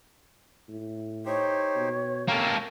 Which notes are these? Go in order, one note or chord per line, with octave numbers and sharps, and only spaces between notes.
A2
D#4 G4 C5 C#5
B2
A#3 C#4 G4 A4 A#4